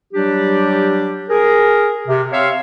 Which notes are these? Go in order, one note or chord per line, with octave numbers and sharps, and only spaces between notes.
F#3 G3 D4 G4
G#4 A#4
C3
C4 C#5 E5 F5